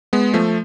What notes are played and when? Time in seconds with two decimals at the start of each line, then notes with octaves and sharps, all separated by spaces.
0.13 G#3 B3
0.33 F3 A3